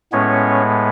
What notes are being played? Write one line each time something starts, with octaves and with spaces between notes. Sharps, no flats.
A2 G#3 B3 C#4 C#5